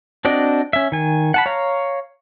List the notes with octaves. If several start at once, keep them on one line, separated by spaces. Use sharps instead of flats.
C4 D4 F#4 D5 D#5
C#4 E5
D#3 G#5
F#5 A5 B5
C#5 F5 A#5